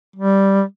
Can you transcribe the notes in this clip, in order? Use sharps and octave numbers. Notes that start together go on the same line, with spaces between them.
G3